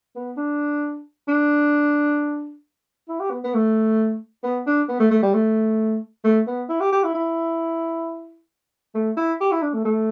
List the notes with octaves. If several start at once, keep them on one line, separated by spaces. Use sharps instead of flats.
B3
D4
D4
E4
G4
B3
B3
A3
B3
D4
B3
A3
A3
G3
A3
A3
B3
E4
G4
G4
E4
E4
A3
E4
G4
E4
D4
A3
A3